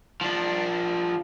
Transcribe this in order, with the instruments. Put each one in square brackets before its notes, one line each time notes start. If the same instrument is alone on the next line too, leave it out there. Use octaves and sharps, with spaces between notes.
[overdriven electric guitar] F3 D4